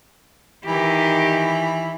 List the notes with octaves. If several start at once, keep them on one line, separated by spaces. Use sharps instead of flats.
D#3 E3 G4